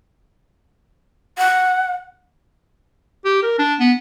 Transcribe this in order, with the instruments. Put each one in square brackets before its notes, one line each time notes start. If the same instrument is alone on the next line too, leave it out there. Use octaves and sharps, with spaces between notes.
[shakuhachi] F#5
[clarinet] G4
A#4
D4
B3